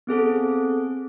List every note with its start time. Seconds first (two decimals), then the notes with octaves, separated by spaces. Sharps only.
0.07 B3 C4 G#4 A4